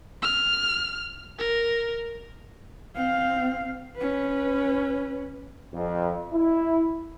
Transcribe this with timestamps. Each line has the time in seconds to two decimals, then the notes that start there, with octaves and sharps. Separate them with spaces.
0.22 F6
1.39 A#4
2.96 C4 F5
3.97 C#4 B4
5.74 F2
6.33 E4